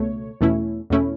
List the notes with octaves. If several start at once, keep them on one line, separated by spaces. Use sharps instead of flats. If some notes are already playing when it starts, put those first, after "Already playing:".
Already playing: C#2 B2 A3 C#5
E2 B2 A3 C#4 E4
E2 B2 A3 C#4 E4